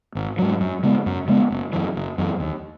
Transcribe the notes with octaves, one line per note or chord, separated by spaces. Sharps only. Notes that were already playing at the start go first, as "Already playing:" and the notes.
G#1
G#2 F#3
F#2
C#3 G#3 B3
F#2
C#3 G#3 B3
F#1
F#2 E3
F#1
F#2 E3
D#2